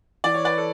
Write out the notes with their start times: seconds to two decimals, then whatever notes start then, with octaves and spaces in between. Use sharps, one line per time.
0.24 E3 D5
0.34 C#5
0.44 B4 D5
0.58 A4